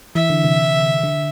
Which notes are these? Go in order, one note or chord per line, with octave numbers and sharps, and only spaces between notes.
E3 E5
D3
C3
D3